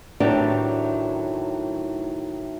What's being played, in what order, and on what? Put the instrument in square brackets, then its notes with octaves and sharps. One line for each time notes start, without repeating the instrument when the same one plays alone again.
[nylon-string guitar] A2 D#3 E3 F#3 D4 G4